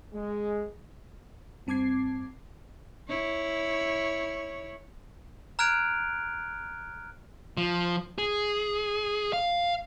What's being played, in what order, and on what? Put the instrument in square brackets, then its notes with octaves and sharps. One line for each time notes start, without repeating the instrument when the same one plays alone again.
[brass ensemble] G#3
[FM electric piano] G2 C4 A5 D6 G#6 C7
[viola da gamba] E4 C#5
[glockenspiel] A#5 F6 F#6 G#6 D7 F7
[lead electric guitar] F3
G#4
F5